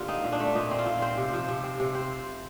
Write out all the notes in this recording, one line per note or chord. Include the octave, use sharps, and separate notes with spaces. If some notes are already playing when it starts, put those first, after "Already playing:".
Already playing: D3 A#3 F4 G4
C4 D#4
A#2
D4
A3
A#2 D#4
C4
F4
A#2
C4 C5
C3
F3
C3
C4
C3
C4 C5